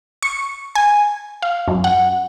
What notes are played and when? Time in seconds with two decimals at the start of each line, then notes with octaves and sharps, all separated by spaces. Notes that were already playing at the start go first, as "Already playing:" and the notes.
0.23 C#6
0.75 G#5
1.42 F5
1.68 F#2
1.84 F#5